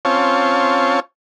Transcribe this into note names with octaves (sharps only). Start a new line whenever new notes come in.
C4 C#4 F4 C#5 A5